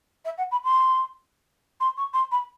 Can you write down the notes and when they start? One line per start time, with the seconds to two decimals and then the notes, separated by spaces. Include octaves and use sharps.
0.25 E5
0.38 F#5
0.51 B5
0.64 C6
1.80 C6
1.97 C#6
2.13 C6
2.31 B5